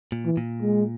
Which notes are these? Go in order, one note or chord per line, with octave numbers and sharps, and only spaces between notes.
A#2
E3
A#2
G#3